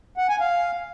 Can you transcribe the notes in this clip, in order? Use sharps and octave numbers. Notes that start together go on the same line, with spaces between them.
F#5
G#5
F5